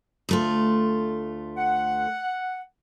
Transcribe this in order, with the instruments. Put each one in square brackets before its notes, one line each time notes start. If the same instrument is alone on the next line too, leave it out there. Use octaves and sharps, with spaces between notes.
[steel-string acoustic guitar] D2 A3 F4
[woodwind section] F#5